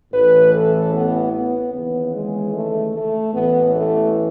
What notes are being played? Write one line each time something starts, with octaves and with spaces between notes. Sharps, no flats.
A1 A2 E3 B4
A4
B3
B3
D#2 C#3 E3 B3
G#3
A3
A3
A1 A2 E3 B3
A3